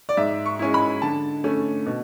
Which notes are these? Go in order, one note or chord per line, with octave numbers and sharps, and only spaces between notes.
D5
G#2 E5
C#6
G#3 C#4 E4
B5
D3 A5
A3 C#4
B2